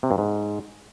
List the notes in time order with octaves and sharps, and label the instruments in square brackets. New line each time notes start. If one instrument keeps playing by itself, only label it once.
[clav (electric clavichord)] C3
G2
G#2